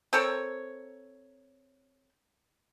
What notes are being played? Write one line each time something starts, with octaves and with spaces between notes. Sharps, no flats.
C4 A4 A#4 C#5